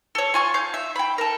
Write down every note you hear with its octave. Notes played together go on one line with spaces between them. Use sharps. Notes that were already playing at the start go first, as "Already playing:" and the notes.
A4 C#5
F4 G#5 C#6
F5 G6
E5
G5 B5
A4 A#4